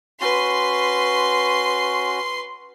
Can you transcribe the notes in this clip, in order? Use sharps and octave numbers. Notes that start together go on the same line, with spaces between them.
C#4 F#4 B4 C6